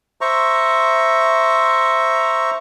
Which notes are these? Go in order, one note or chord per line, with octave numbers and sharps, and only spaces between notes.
C5 E5 A#5 C#6